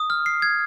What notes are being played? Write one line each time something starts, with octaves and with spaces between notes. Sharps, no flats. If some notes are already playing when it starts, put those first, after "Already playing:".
Already playing: D#6
F6
C7
G#6